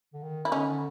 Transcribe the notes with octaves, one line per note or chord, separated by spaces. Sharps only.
D3
D#3
E4
D3 C#4 D#4